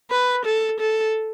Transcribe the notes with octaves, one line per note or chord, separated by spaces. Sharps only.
B4
A4
A4